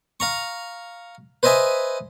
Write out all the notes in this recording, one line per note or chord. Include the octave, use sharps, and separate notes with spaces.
F5 A#5 C#6
B4 C5 D#5 E5 G#5